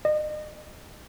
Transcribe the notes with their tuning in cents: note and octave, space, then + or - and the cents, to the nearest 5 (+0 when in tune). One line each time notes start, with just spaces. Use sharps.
D#5 -40